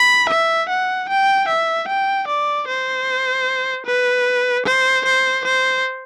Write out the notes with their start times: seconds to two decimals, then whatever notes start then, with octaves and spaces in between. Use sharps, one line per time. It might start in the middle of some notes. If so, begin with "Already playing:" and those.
Already playing: B5
0.29 E5
0.69 F#5
1.09 G5
1.49 E5
1.88 G5
2.28 D5
2.68 C5
3.86 B4
4.66 C5
5.05 C5
5.45 C5